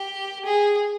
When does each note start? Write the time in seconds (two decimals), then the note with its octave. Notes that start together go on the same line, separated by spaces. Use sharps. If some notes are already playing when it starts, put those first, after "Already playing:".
Already playing: G4
0.45 G#4